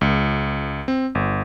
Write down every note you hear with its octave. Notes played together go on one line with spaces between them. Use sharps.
C#2
C4
G1